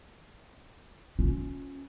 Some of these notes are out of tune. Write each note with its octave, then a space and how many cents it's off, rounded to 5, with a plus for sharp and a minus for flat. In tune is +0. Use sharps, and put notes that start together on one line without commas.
C#4 +0 F4 +35